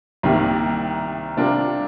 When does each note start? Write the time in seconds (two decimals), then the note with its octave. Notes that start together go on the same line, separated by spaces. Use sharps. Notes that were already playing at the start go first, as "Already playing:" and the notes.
0.23 C2 C3 D#3 G3 A#3
1.37 C3 G3 D4 F4 A#4